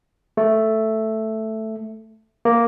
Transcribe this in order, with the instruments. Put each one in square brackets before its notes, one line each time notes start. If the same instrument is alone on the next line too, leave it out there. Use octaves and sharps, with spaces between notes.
[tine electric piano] A3
A#3